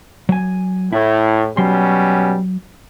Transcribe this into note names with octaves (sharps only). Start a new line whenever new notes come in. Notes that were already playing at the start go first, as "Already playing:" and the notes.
F#3 G#5
A2 E4
B2 F#3 G3 C#4 C6